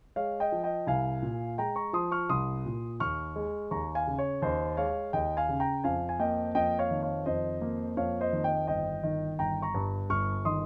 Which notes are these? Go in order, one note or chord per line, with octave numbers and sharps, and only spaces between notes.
G#3 C#5 F5
D#5 G5
F3
D#5 G5
C2 F5 G#5
A#2
G#3 G5 A#5
A#5 C#6
F3 C6 D#6
C#6 F6
C2 C6 D#6
A#2
D#2 C#6 F6
G#3
D#2 A#5 C#6
F5 G#5
C#3
C#5
D#2 C5 D#5
G#3 C#5 F5
D#2 D#5 G5
F5 G#5
C#3
G5 A#5
F2 F5 G#5
G#5
A#3 D#5 G5
F2 D#5 G5
C#5 F5
D#3
C#5 F5
F2 C5 D#5
A#3
F2 C#5 F5
C5 D#5
D#3
D#5 G5
G1 D#5 G5
D#3
G1 G5 A#5
A#5 C#6
G2
G1 C#6 F6
D#3 C6 D#6